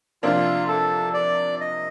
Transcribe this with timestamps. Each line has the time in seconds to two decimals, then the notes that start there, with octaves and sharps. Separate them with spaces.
0.23 C3 F3 A#3 D4 F4
0.68 A4
1.14 D5
1.61 D#5